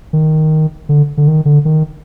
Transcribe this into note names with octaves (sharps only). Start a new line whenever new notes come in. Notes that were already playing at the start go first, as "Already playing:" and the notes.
D#3
D3
D3
D#3
D3
D#3